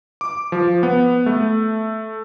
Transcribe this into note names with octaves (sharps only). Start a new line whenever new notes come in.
D6
F3
B3
A3